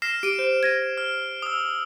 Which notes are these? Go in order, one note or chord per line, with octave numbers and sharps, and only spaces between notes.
F6 A#6 C7 E7
G4 D7 D#7
C5
G#6 A#6 D#7
F6
D#6 E6